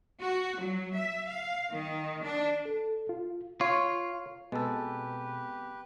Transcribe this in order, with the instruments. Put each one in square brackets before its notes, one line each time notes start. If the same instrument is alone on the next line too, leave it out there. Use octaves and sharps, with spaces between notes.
[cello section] F#4
F#3
E5
F5
D#3
D4
[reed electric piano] A4
F4
[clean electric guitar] F4 [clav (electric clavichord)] C#5
[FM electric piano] B2 [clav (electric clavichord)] G#3 A4 [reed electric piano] B3 C4 [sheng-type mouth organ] G4 B4